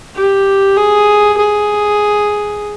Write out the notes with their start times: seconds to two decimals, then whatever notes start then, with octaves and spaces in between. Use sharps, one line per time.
0.16 G4
0.76 G#4
1.37 G#4